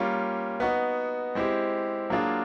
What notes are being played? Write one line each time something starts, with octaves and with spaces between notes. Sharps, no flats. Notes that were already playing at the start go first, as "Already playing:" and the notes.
Already playing: G3 A#3 C#4 F4
B3 D#4 F#4
G#3 C4 E4 G4
F#3 A#3 D4 F4 G#4